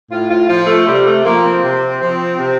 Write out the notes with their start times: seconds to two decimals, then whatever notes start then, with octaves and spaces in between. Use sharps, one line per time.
0.11 A2 F4
0.30 F4
0.48 F3 F4
0.67 A3
0.86 C3 G3
1.05 A3
1.24 F3 A#3
1.44 C4
1.62 C3
2.00 F3
2.38 C3